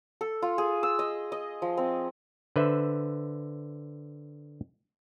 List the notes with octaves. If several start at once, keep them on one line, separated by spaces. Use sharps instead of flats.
A4
F4
G#4
E6
D#5
D#5
F3
C4
D3 B4 C5 E5